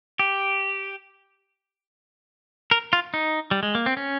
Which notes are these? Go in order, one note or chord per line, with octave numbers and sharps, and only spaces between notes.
G4
A#4
F4
D#4
G3
G#3
A#3
C4
C#4